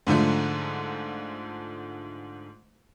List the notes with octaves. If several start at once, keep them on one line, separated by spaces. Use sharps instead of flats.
G#2 D3 F3 A3